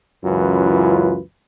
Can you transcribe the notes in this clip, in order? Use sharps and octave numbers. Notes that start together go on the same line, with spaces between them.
C#2 F#2 E3 E4 F4 B4